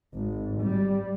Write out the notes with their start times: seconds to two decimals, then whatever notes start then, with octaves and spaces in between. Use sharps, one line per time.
0.15 G#1
0.61 G3